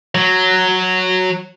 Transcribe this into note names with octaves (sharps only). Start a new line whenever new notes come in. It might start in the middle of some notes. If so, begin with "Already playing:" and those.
F#3